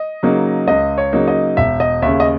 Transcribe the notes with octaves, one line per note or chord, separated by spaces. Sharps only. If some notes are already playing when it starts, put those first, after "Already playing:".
Already playing: D#5
C#3 F#3 A#3 D#4
C#2 D#5
C#5
C#3 F#3 A#3 D#4
D#5
E1 E5
D#5
D#2 C#3 E5
D#5